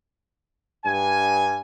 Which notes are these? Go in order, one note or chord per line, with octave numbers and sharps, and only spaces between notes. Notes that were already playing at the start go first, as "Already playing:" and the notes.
G2 G#5